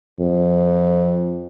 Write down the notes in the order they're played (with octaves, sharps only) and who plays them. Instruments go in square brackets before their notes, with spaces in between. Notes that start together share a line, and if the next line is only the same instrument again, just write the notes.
[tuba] F2